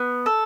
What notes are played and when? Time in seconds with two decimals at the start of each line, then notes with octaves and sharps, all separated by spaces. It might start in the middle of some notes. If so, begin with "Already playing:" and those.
Already playing: B3
0.26 A4